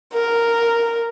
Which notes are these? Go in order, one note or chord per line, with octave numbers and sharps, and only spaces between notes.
A#4